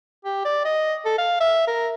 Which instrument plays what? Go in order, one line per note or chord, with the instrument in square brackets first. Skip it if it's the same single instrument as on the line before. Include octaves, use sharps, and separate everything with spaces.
[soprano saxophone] G4
D5
D#5
A4
F5
E5
A#4